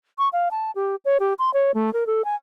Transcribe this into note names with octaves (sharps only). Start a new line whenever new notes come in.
C#6
F5
A5
G4
C#5
G4
C6
C#5
A3
A#4
A4
G#5